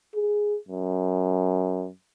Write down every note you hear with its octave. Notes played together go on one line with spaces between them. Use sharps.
G#4
F#2